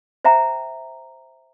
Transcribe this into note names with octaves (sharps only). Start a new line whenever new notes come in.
C5 E5 G5 A#5